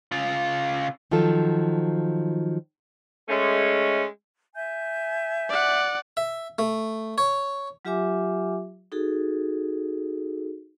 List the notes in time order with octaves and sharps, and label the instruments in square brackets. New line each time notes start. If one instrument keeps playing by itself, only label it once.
[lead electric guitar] C#3 F4
[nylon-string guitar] D#3 F3 F#3 F4 A4
[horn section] G#3 A3 C#4
[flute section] E5 G#5 G6
[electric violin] D5 F#5
[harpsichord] E5
A3
C#5
[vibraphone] F#3 F4 G4 E5 G#5 D6
D#4 F#4 G#4 A4